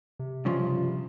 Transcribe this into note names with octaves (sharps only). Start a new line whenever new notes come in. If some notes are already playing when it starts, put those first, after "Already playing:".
C3
G2 C#3 F3